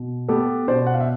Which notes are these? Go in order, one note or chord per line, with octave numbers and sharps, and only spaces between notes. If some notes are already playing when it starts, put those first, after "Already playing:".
Already playing: B2
B3 G4 A4
B2 C5 D5
F#5
F5
E5